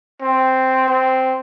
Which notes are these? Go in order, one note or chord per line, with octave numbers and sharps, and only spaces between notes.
C4
C4